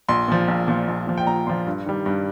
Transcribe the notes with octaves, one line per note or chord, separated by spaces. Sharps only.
A#1 C6
A#2 F3
A#1
A#2 F3
A#1
A#2 F3
G5
A#1 A#5
A#2 F3 C6
G2
D#3 G3
G2